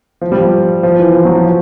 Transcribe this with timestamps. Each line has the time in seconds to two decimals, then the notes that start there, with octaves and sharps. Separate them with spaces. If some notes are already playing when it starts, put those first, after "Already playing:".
0.21 F3
0.32 F3 G3
0.83 F3
0.99 E3
1.15 F3
1.25 F#3
1.35 F3